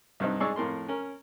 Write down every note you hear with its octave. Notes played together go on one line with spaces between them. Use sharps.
C2 G2 C4 D#4
G#2 G#3 G#4 D5 C#6 E6
F2 A2 A#4 C6
C#4 A#4